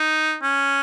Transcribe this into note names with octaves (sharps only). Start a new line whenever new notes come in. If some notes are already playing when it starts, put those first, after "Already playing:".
Already playing: D#4
C#4